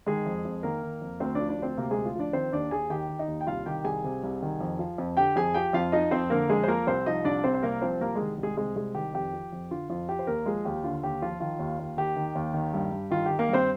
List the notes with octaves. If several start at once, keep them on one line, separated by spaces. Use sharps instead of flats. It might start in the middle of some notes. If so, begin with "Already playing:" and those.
D#3 G#3 G#4
F2
F2
D#3 A#3 A#4
D#3
F2
D2 C4 C5
F3 D4 D5
D4 D5
D2 C4 C5
C3 A#3 A#4
G#3 G#4
D2
F4
F3 D4 D5
D#3 C4 C5
D#2 D4 D5
D#2 G#4 G#5
D#3 G4 G5
D#3
D#4 D#5
D#2
G5
C2 F4 F5
D#3 G4 G5
C2 G#4 G#5
C3
C2
D#3
F2
F3
F2
D3 G4 G5
F2 G#4 G#5
F3 G4 G5
F2 F4 F5
F3 D#4 D#5
F2 C4 C5
D3 A#3 A#4
F2 G#3 G#4
C5
F3 A#3 A#4
C2 C4 C5
F3 D#4 D#5
C2 D4 D5
C3 C4 C5
C5
C2 A#3 A#4
F3 C4 C5
C2 A#3 A#4
D#3 G#3 G#4
C2
G#3 G#4
C3 G#3 G#4
C2 G#3 G#4
D#3 G4
F2 G4
F3
F2
D3 F4
F2 F4
F3 G4
C5
D#2 A#3 A#4
F3 G#3 G#4
D#2 G4
D3 F4
D#2 G4
F3 F4
D#3 F4
D#2
D#2
D#3 G4
D#3
D#2
D#3
G2
G2
D#3 F4
D#3 G4
A#3 A#4
G2
C4 C5